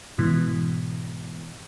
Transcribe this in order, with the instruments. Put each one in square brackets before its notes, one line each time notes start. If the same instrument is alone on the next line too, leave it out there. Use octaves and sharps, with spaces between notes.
[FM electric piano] G#2 B2 E3